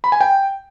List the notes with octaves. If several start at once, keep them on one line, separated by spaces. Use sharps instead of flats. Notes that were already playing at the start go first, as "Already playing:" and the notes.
B5
G#5
G5